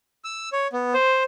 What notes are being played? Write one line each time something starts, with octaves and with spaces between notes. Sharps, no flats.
E6
C#5
B3
C5